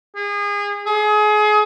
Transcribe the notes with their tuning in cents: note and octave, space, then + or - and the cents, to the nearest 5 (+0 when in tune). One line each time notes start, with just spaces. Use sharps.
G#4 -30
G#4 +30